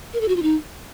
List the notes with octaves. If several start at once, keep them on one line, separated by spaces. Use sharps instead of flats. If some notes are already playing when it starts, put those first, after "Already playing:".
A#4
A4
F#4
F4
D#4